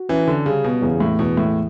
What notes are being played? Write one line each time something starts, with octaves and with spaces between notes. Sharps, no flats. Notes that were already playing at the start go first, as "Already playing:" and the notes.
Already playing: F#4
E3 C#4
D3
C#3 G3
B2
E2 C#3
A2
E2 B2
A2